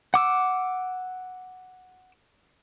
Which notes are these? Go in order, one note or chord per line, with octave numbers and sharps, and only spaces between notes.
F#5 D6 E6